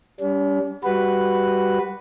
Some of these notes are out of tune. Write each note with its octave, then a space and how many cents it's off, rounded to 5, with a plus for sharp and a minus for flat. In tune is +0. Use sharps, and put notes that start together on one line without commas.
G3 +0 C#4 +45
G3 +0 F#4 +0 B4 +0